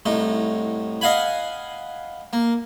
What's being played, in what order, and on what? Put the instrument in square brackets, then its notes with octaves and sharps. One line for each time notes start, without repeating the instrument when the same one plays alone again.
[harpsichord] C2 A2 D#4
D#5 F5 F#5 G#5 B5
A#3